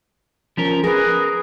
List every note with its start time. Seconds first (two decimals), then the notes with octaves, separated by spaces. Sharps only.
0.57 F3 C#4 A#4
0.84 G#4 A#4 B4